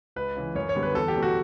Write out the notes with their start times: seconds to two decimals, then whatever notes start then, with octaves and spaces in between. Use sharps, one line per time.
0.16 C#2 B4
0.37 C#3 E3
0.55 F#2 C#5
0.69 C#5
0.76 D3 G3 B3
0.83 B4
0.95 E2 A4
1.08 G4
1.16 B2 F#3 A3
1.23 F#4